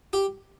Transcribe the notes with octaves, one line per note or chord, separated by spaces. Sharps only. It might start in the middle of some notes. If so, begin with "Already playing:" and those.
G4